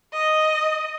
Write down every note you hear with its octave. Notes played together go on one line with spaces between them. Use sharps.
D#5